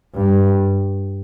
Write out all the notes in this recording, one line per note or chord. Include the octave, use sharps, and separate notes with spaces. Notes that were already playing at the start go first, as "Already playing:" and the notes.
G2